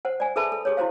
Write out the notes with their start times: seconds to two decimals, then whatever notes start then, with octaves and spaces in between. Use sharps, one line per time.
0.05 C5 F#5
0.20 D5 G#5
0.36 G#4 A4 B4 E5 A5 B5
0.52 A4
0.65 G4 G#4 C#5
0.77 E4 F#4 C5 F5